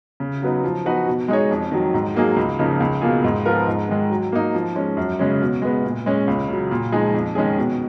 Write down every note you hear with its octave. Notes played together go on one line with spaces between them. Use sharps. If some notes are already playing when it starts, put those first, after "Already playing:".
C#3
F#3 B3 D#4
F3
B3 D#4 F#4 B4
B2
G#3 D#4 G#4 C#5
F2
D#3 F#3
G#2
F#3 A#3 D#4 G#4
C#2
C#3 F3 A#3 D#4
C#2
B2 A#3 F4 G#4
G#2
F3 B3 F4 A#4
G#2
D#3 G#3
F#3
A#3 D#4
F3
G#3 C#4
F#2
C#3 G#3 C#4
B2
G#3 B3
A#2
G#3 C#4
C#2
C#3 F#3
A#2
F3 G#3 D#4 G#4
F2
D#3 G#3 C#4 G#4
B2